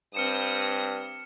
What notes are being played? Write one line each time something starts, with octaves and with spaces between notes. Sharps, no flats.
G2 C4 D#6 F6 C#7 E7